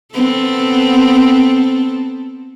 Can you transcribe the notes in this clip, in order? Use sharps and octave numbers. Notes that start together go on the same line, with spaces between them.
B3 C4 A4